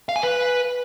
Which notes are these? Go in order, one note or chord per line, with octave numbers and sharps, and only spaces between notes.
F5
G#5
B4